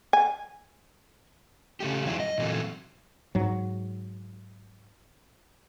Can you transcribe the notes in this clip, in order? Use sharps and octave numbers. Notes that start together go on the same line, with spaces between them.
G#5
C#3 A3 G4
F2 E3 F#3 G#3 C4 E4
D#5
A#2 E3 F#3 C4 A4
G#2 F#3